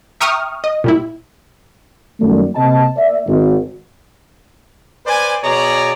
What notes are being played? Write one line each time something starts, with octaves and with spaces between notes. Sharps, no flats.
E5 G5 A#5 C#6 D#6 F6
D#5
A#2 G3 E4
F#2 D#3 G3 A3 A#3 D5
C3 A#3 D#5 A5
A#3 D5 E5
G#1
B4 C5 D5 G#5
B2 G#4 C#5 D5 A#5